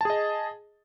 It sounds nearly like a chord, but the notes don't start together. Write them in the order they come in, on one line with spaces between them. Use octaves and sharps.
A5 G#4 D#5